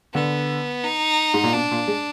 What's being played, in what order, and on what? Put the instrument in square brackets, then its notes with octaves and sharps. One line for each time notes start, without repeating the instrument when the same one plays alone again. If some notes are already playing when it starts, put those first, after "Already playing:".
[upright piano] D3 [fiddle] B3
[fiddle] D#4
[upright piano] G#2
A#2
[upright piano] B2 [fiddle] D4
[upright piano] A#2
G#3